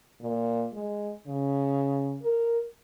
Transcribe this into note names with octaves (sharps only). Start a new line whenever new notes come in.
A#2
G#3
C#3
A#4